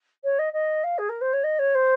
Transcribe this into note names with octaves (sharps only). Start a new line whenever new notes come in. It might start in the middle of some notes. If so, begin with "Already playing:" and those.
C#5
D#5
D#5
F5
G#4
A#4
C5
C#5
D#5
C#5
C5